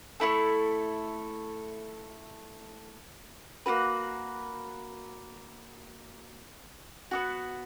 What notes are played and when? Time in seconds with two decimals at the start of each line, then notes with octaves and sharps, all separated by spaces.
0.20 A3 C4 E4 A4
3.66 A#3 C#4 F#4 B4
7.11 B3 D4 F#4